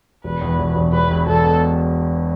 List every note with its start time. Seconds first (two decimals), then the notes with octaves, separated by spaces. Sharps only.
0.24 E1 B4
0.41 E2
0.59 E1
0.75 E1
0.92 E1 B4
1.10 E1
1.26 E1 A4
1.44 B2